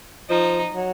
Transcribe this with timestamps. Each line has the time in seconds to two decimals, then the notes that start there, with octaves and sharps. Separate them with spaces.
0.30 F3 D#4
0.75 F#3